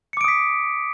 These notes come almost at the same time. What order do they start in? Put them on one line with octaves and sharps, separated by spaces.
C#7 D6 D7 D#6 B6